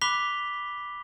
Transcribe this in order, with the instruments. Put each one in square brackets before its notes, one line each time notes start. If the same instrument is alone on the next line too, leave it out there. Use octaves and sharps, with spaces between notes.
[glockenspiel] B5 D6 F#6 B6 F7 G7